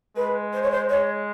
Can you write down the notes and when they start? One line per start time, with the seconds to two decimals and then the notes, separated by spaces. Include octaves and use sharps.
0.16 G#3 B4
0.53 C5
0.62 C#5
0.72 C5
0.89 G#3 C#5